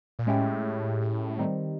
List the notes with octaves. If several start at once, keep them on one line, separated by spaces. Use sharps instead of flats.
A#2
A2 G#3 C#4 E4 G4
D#3 G3 C4 D#4